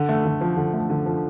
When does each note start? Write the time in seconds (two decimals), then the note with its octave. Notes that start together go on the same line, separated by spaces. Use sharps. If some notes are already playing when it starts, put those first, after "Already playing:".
Already playing: D3
0.09 A3
0.25 D3
0.41 F3
0.57 D3
0.73 A3
0.90 D3
1.06 F3